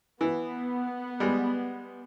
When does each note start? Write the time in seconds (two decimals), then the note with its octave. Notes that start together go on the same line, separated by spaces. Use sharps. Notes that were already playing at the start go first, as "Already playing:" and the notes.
0.21 E3 B3
1.20 G3 G#3